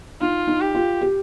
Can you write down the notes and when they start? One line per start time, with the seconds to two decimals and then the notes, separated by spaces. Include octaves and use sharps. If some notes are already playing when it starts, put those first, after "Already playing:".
0.21 D#4 F4
0.47 D#4
0.61 G4
0.75 F4
1.01 G4